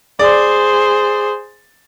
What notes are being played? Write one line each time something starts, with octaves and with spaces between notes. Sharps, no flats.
G#4 C5 D5